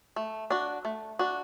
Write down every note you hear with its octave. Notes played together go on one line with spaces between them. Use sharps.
A3
D4 F#4
A3
D4 F#4